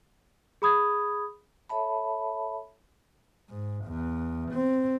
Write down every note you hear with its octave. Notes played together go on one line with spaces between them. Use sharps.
G#4 B5 D#6 G#6
A4 C#5 E5 A5 B5
G#2
E2
C4